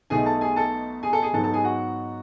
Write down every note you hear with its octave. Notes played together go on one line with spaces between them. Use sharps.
B1 B2 A3 D#4 G#4 G#5
A4 A5
G#4 G#5
A4 A5
G#4 G#5
A4 A5
G#4 G#5
G#2 F#3 B3 D#4 A4 A5
A4 A5
G#4 G#5
F#4 F#5